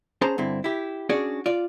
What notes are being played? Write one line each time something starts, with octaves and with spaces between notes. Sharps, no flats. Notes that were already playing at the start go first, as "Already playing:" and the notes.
C#4 G#4 C5 A5 A#5
G2 D3 C4 E4
E4 G4
C#4 D4 F#4 G#4 D5
F4 D5